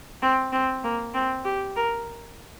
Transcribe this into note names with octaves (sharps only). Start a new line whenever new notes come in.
C4
C4
A#3
C4
G4
A#4